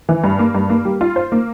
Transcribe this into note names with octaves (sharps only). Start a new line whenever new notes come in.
E3
G2
A#3
G2
A#3
G3
F4
C5
A#3